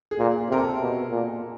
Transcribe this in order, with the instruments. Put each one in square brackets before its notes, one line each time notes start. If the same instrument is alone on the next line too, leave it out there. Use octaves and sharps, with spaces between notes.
[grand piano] G#4
[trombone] A#2
[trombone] C3 [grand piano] A#4
[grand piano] A4
[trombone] B2
A#2